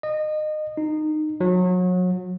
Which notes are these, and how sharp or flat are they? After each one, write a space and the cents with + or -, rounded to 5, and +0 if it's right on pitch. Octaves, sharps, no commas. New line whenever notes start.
D#5 -25
D#4 -20
F#3 -30